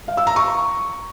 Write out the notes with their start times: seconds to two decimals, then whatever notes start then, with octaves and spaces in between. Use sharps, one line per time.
0.08 F5
0.17 E6
0.27 A#5
0.36 C#6